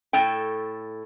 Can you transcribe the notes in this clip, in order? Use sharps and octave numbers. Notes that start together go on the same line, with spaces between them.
A2 A4 G5